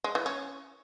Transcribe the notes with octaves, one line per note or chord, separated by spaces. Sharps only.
G#3
E3
C#4